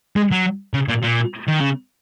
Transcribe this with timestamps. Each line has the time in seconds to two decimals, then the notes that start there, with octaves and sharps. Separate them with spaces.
0.16 G#3
0.31 F#3
0.74 C#3
0.88 A#2
1.03 A#2
1.48 D#3
1.60 C#3